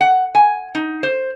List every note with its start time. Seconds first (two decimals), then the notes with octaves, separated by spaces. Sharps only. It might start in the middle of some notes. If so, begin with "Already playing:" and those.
0.01 F#5
0.35 G#5
0.75 D#4
1.03 C5